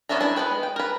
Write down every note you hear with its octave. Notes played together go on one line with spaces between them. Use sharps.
B3 C#4 D4 E5 A#5
D4 E4
G#3 B3 B4 G5
G5
A#4 B4